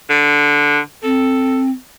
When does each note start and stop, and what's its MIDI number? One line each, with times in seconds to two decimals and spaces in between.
0.10 0.79 50
1.04 1.70 60
1.04 1.64 69